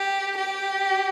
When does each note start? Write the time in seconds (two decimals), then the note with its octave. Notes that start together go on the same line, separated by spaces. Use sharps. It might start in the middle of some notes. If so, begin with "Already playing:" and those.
Already playing: G4
0.38 G4